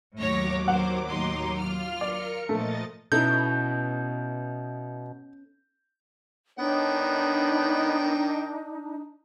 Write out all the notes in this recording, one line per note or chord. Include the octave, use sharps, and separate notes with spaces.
D#2 A2 F#3 C#5 D6 A#6
A#4 C5 F#5
A2 D#4 C6
F4 F6
A#4 D5 C#7
A#2 F3 A3 D#5 A6
B2 B3 C#4 D#4 E4 A4 G6
D#3 B3 D4 D#4 C#5 G5